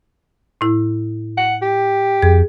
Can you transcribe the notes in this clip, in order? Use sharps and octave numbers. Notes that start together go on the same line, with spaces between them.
A2 E4
F#5
G4
F2 G#4